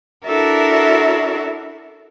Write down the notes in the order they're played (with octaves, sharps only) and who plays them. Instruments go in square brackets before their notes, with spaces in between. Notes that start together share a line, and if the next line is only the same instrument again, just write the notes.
[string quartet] D4 E4 F#4 A4 A#4 E5